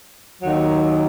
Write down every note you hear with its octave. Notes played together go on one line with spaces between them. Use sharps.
D#2 D#3 F#3